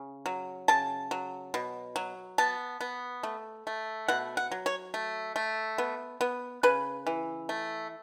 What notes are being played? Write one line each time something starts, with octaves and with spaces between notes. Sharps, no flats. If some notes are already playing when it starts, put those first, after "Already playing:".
Already playing: C#3
F#3
C#3 A5
F#3
B2
F#3
B3 A5
B3
A3
A3
B2 F#5
F#5
F#3
C#5
A3
A3
B3
B3
C#3 B4
E3
A3